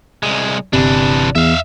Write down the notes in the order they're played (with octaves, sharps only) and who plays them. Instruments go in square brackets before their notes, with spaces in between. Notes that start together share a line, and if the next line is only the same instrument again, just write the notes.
[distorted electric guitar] C2 G#3
[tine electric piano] G1 C3 [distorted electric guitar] E3 D4
[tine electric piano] E2 [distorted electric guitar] E5 F5